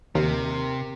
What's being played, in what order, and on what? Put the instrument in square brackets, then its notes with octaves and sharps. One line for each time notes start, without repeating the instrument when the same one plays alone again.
[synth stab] D#2 [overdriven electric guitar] C3 [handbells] A#4